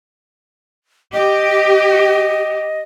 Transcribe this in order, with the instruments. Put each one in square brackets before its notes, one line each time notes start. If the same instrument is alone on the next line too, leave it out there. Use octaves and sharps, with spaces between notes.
[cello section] G4 [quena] D#5